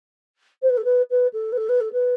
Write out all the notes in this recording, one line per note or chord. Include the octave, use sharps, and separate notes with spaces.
C5
B4
A4
B4
B4
A4
B4
A4
B4
A4
B4